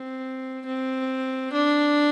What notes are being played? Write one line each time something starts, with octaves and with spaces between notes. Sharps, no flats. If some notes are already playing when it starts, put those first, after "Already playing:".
Already playing: C4
C4
D4